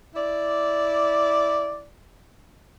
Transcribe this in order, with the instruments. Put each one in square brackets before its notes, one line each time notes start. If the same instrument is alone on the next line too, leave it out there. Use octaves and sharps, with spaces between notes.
[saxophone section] E4 D5